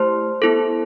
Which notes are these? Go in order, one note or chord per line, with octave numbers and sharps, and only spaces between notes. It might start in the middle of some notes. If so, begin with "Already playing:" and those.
Already playing: A3 E4 G4 C5 C6
B3 E4 A4